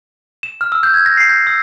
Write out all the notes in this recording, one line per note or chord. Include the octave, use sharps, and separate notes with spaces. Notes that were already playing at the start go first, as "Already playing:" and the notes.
E7
F6
E6
G6
G#6
A#6
C7
G6
E6